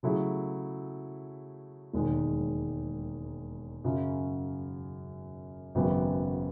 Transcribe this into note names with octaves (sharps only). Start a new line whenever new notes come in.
C#3 F#3 A3 E4 G#4
E1 D#2 D#3 G#3
F#2 C#3 F#3
G#1 F#2 C#3 F#3 B3